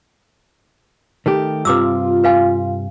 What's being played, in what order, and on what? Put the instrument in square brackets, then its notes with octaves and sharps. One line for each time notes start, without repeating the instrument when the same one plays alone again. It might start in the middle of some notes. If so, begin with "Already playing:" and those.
[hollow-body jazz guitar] D#3 A3 G4
[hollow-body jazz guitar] G2 C3 [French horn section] F4 [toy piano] B4 D6 E6
[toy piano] B4 F5 G#5